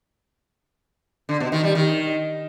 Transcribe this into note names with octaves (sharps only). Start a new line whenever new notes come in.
D3
B2
D#3
G3
D#3